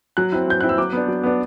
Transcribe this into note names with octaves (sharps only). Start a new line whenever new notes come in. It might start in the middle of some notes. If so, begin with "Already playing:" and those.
F#3 F#6
C4 E4 F#6
F#3 G6
C4 E4 F#6
E6
F#3 D6
B3 D4
F#3
B3 D4